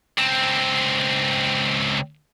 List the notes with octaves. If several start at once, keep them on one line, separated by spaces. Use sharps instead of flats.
C#2 C4